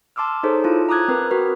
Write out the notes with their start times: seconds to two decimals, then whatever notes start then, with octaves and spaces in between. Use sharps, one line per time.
0.16 A5 C6 D6 E6 F6
0.43 D#4 G#4 A4 C5 C#5
0.64 E4 F4 A5
0.89 A#5 D6 D#6 F#6 G#6
1.08 C4 A#4 B4
1.31 F#4 A#4 B4